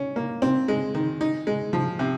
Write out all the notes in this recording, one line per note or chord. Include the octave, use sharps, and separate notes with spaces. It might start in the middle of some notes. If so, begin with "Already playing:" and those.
Already playing: C#4
A#3
C4
G#3
D#3
D#4
G#3
F3
C3